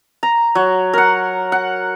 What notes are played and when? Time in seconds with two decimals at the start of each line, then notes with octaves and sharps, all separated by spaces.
0.23 A#5
0.55 F#3
0.93 A#4 F#5
1.52 F#5